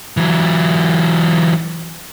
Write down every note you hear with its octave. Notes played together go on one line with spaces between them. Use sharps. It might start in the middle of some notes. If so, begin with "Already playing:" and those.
E3 F#3